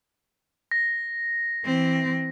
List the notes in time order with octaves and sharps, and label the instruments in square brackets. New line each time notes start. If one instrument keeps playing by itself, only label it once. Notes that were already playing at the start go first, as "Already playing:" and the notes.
[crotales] A#6
[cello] E3 C4